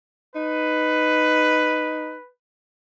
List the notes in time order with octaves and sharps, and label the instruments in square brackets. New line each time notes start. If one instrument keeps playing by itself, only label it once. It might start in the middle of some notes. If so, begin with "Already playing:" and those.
[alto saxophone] D#4 [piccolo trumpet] B4